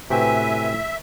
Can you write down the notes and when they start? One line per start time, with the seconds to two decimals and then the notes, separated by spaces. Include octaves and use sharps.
0.10 A2 C3 F#4 B4 E5 G5 G#5